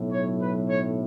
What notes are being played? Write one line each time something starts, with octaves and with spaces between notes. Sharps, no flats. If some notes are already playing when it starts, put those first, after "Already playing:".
Already playing: B1 A2 F#3
C#5
B4
C#5